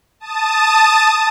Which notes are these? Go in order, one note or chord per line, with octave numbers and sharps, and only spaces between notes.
A5 D#6